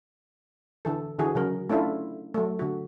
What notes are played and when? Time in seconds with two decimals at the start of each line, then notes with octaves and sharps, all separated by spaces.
0.85 D3 E3 A4
1.19 D3 E3 F#4 G#4
1.35 C#3 F#3 A#4
1.70 A3 C#4 D4 E4 F4
2.34 F#3 A3
2.59 D3 F#4